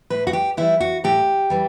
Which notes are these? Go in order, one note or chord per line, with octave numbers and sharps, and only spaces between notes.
A2 B4
F#4
G4
E3 G3 E4
F#4
A2 G4
E3 G3